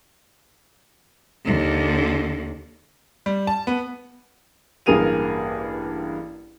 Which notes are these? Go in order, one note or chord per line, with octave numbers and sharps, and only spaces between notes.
D#2 D3
G3
A5
B3
A1 G2 A#3 G#4 D#7 F7